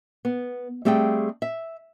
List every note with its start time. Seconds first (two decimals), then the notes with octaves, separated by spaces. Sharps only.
0.25 B3
0.85 G3 A3 C4 G#4 F5 G5
1.42 E5